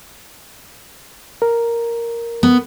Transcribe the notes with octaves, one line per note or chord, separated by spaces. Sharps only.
A#4
B3